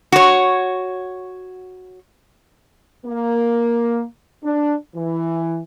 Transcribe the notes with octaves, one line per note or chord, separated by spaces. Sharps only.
F#4 C#5
A#3
D4
E3